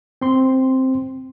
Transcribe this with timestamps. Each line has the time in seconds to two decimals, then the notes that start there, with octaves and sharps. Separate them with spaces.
0.22 C4 C6